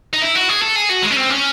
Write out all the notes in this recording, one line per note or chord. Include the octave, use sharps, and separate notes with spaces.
D#4
E4
F#4
G#4
A4
G#4
F#4
G#3
C#4
C4
C#4